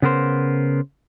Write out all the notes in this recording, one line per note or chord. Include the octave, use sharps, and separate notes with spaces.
C#3 B3 A#4 C5